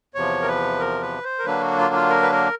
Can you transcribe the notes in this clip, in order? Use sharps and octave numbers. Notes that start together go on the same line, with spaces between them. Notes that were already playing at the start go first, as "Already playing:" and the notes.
E2 C3 F3 C#5
A#4
B4
A#4
B4
C5
A#4
D3 F#3 A#3 D4 B4
F#4
F4
F4
A#4
B4
A#4